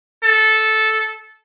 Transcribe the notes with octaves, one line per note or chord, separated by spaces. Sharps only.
A4